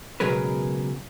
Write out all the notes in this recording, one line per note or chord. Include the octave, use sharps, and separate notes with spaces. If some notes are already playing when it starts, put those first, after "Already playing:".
C#2 B2 F#3 G#4 A#4 B4